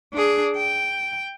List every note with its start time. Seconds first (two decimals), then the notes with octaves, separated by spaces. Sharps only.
0.13 D4 G#4
0.57 G5